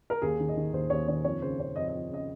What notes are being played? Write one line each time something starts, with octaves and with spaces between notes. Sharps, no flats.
A#4
D#2 G#4
D#3
D#5
D#3
D#2 C5
D#2 C#5
D#3 C#5
F2 C#5
C#3 C5
C#3 C#5
F2 D#5
D#5
F2
C#3 D#5